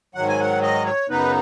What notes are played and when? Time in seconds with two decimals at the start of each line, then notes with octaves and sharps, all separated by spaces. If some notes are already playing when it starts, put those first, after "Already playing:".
0.15 G#2 D#3 F#3 F#5
0.28 G#5
0.40 F#5
0.62 D#5
0.86 C#5
1.09 F#2 C#3 B3 D#4 B4